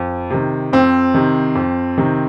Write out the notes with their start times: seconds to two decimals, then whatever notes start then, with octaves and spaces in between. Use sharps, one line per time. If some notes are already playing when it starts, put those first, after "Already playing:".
Already playing: F2
0.30 C3 D#3
0.73 F2 C4
1.14 C3 D#3
1.55 F2
1.98 C3 D#3